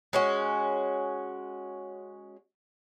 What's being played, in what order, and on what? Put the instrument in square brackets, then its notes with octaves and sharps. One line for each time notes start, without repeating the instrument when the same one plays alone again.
[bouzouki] G#3 C#4 F#4